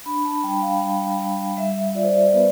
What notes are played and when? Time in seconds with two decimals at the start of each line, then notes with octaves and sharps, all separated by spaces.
0.06 D4 B5
0.25 A5
0.43 G3 G5
0.62 F5
0.81 G3
1.19 G3
1.57 G3 E5
1.95 F4 D5
2.03 C5
2.11 D5
2.33 B3 B4